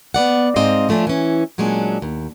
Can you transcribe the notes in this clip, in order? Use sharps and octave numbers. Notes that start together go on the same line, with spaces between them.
B3 D5 F#5
G#2 C4 D#5 F5
F3 A3 C#4 D4 F4
E3 C#4
A#2 F#3 G#3 C#4 D4
D#2